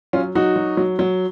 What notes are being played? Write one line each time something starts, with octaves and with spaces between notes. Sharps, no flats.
F#3 C#4 F4
F#3 D#4 F#4
F#3
F#3
F#3